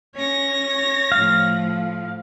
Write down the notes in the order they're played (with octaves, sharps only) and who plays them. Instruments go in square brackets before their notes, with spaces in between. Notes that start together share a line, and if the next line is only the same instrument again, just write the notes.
[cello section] C#4 [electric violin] C#5 A#6
[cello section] A2 F3 [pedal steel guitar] F5